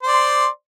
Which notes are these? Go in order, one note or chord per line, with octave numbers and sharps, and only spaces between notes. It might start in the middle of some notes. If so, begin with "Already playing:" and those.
C5 D5 C6